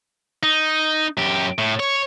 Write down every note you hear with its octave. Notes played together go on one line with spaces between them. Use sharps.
D#4
F#2 G4
A2
C#5